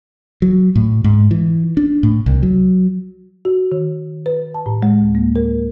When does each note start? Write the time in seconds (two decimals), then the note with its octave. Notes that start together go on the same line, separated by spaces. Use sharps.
0.42 F#3
0.75 A2
1.04 G#2
1.31 E3
1.77 D4
2.03 A2
2.26 C2
2.43 F#3
3.45 F#4
3.72 D#3
4.26 B4
4.54 A5
4.66 A2
4.82 G#3
5.01 D2
5.15 A#3
5.36 A#4